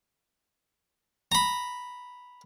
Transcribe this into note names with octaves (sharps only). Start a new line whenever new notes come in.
A#5 B5